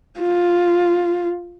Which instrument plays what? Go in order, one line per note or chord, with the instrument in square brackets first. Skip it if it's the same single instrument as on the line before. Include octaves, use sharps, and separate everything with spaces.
[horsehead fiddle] F4